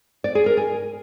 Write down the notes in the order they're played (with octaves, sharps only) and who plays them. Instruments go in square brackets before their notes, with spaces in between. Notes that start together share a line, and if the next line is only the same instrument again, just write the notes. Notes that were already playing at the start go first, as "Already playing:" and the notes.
[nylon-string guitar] D5
G#4
A#4
G#5